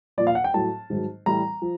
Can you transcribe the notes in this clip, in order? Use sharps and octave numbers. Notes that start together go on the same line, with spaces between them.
A#2 F3 D5
F5
F#5
G5
A2 F#3 A5
G#2 D#3 F#3
A2 E3 G3 A#5
F3